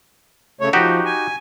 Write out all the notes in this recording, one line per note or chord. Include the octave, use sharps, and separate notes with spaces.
C#3 A3 C#5
F3 D#4 F#4 G4
G#5